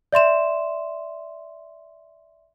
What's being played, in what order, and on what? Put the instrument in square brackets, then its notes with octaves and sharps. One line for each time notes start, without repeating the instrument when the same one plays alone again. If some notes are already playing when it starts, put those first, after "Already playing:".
[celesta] D5 E5 C6 E7